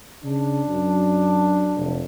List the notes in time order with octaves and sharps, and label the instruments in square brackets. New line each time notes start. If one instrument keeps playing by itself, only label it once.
[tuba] C#3 [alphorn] D4
[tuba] F#2
F1